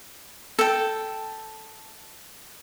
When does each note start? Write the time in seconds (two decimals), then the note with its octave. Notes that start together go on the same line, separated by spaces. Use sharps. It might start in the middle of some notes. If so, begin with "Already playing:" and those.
0.59 A4 G5